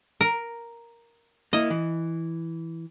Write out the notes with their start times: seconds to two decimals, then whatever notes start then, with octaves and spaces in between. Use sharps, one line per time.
0.21 A#4
1.53 A#3 E4 D#5
1.70 E3